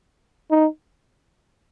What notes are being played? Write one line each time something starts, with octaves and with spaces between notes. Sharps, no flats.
D#4